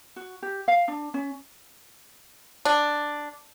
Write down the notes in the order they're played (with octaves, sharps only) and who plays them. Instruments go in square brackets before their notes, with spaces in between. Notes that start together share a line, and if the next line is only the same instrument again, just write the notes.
[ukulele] F#4
G4
F5
D4
C#4
[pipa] D4